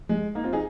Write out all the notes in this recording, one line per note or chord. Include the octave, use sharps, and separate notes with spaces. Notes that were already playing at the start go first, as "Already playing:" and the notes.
G#3
A#3 D#4
C4 F4
D#4 G#4